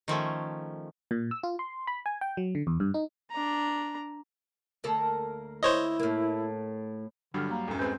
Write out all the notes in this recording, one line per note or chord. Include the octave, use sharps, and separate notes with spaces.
D#3 F3 A3 C#4
A#2
E6
F4
C6
B5
G#5
G5
F#3
D3
E2
G2
D#4
D4 A#5
D2 A#3 A4
E4 C5 C#5 D#5
A2 A#3
G2 D3 F#3 G3 D4 F6
A#3 A#5
D1 F#2
G#3 C4 B4 G6